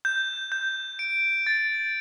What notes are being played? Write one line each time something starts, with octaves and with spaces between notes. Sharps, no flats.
G6
G6
D7
A6